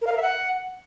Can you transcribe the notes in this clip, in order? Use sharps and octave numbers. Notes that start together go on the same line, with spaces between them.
A#4
F5
A#4
E5
F#5